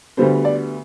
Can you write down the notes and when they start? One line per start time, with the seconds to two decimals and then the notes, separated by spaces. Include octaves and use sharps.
0.17 D2 D3 G3 B3 C5
0.45 D5